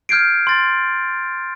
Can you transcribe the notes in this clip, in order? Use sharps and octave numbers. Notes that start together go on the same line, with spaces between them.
F6 G6 G#6 C7 D7
C6 A6